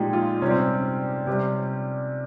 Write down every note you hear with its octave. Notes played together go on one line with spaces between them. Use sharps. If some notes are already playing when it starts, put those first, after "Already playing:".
Already playing: A#2 F3 G#3 D#4 G4
F4
C3 G3 C#4
C4
C#4
C3 G3